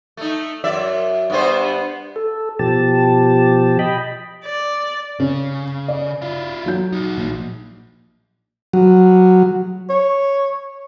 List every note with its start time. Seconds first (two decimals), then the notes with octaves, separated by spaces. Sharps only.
0.17 A3 D#4
0.64 F#2 D5 E5
1.30 G2 B3 C5
2.16 A4
2.59 B2 F3 G4 A5
3.79 D#5 G5 B5
4.45 D5
5.20 C#3 C#4
5.88 D5
6.22 E4 F4
6.66 F#3 G6
6.93 D#4 F#4
7.17 A#1
8.73 F#3
9.90 C#5